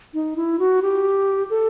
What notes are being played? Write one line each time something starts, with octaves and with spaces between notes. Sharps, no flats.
D#4
E4
F#4
G4
A4